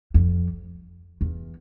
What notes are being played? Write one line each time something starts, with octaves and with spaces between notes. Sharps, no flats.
F2
E2